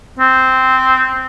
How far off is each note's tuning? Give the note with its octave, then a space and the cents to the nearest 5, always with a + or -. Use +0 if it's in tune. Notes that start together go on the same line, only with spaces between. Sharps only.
C4 -10